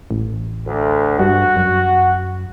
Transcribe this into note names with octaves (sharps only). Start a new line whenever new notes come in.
A1
D2
G2 F#4
F#2